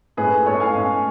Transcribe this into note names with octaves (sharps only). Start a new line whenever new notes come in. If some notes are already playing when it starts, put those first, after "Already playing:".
A2 G#3 C#4 G#4 B4
A2 G#3 C#4 A4 C#5
F5 G#5
A2 G#3 C#4